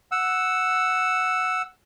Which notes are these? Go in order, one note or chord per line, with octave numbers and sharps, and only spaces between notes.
F#5 E6